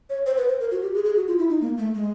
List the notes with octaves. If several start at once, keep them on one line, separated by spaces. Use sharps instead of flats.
C#5
C5
B4
C5
A#4
F#4
G4
G#4
G#4
F#4
F4
E4
D#4
A#3
A3
G#3